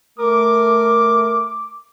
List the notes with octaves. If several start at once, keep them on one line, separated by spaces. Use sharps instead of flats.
A3 A#4 D6